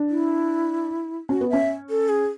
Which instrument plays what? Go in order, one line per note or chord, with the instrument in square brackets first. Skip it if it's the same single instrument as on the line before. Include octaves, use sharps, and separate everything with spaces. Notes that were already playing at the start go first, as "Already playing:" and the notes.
Already playing: [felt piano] D4
[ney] E4
[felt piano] C#4 [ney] F#4
[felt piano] B3
[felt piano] C#4 [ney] E5
[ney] A4
G#4